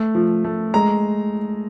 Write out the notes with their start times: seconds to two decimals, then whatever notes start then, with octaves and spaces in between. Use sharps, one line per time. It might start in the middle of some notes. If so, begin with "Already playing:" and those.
Already playing: A3
0.15 F3
0.44 A3
0.74 G#3 A#5